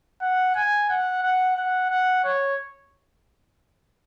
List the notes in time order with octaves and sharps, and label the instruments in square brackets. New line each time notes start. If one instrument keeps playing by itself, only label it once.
[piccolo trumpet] F#5
G#5
F#5
F#5
F#5
F#5
C#5